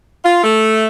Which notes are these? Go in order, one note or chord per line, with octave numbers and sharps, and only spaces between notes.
F4
A3